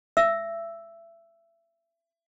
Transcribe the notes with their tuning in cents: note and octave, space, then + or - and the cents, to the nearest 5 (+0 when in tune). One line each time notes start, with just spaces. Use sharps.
E5 +25 E6 +0